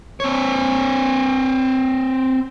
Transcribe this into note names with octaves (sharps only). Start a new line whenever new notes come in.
C4 C#5